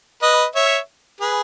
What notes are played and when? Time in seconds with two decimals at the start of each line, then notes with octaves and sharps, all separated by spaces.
0.22 B4 D#5
0.55 C#5 E5
1.21 G#4 B4